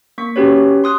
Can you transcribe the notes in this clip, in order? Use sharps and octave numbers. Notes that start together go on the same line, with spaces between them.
A#3 C#6 B6
C#4 F#4 G4 B4 C#5
C6 D#6 F#6